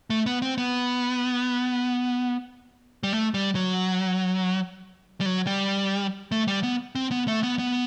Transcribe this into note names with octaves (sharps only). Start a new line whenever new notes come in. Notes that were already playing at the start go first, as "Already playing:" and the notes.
A3
B3
C4
B3
G3
A3
G3
F#3
G3
F#3
G3
A3
G3
B3
C4
B3
A3
B3
B3